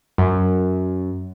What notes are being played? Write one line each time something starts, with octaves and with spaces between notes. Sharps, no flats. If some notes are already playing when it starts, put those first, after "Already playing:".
F#2